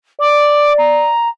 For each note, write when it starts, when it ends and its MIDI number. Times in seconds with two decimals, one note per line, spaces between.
0.20 1.11 74
0.20 0.73 86
0.78 1.28 82